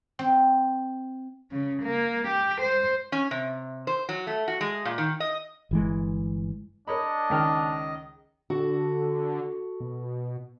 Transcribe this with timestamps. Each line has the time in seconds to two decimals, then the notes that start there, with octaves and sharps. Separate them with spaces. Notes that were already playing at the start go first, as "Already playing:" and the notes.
0.19 C4
1.51 C#3
1.83 A#3
2.28 G4
2.61 C5
3.12 C#4
3.31 C3
3.87 C5
4.09 F#3
4.27 A3
4.48 F#4
4.61 G#3
4.85 A#2
4.98 D#3
5.20 D#5
5.71 G1 E3 G#3
6.87 D4 A#4 C#5 D#5 B5
7.30 C#2 D#3 F6
8.50 D3 F#4 A4
9.80 B2